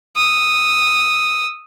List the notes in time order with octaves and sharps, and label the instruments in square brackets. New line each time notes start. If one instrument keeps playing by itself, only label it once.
[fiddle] D#6 E6